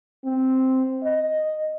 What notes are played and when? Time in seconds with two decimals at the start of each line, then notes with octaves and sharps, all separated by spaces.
0.24 C4
1.04 D#5